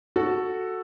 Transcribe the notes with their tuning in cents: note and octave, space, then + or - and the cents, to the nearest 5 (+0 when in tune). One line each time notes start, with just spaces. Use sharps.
F#4 +0 A4 +5